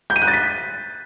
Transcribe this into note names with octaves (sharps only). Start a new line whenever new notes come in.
G6
D#7
F#6
A6
B6